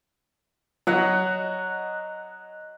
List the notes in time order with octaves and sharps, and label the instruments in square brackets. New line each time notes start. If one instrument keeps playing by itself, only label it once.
[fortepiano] F#3 [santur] D#5 F#5